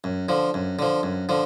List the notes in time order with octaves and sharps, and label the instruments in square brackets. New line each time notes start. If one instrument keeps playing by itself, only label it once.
[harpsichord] F#2
D3 F3
F#2
D3 F3
F#2
D3 F3